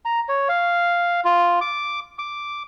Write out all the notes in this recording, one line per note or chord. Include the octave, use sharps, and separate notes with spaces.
A#5
C#5
F5
F4
D6
D6